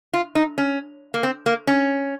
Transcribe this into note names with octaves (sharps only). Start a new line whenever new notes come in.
F4
D#4
C#4
A#3
C4
A#3
C#4